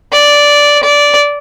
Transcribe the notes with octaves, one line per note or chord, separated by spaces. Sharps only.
D5
D5